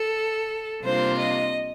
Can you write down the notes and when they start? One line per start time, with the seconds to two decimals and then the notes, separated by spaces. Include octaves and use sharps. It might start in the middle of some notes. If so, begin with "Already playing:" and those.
Already playing: A4
0.83 C3 G3 A#3 D4 F4 C5
1.19 D#5